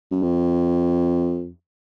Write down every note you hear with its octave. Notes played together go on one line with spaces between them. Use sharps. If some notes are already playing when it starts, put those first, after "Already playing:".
F#2
F2